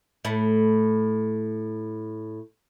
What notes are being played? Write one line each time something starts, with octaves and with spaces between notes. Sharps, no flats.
A2 A3